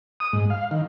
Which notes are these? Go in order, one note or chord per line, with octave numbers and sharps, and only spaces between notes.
D#6
G#2
F5
D#3